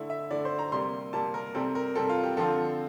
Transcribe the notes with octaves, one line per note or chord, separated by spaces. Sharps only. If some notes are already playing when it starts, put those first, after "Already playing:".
Already playing: D3 A3 E4
E5
D3 A3 E4 D5
C5
A#5
C3 G3 A#3 C6
C3 G3 A#3 A5
A#4
C3 G3 C4 A4
A#4
C3 G3 C4 A4
F4
G4
D3 F3 C4 F4 A4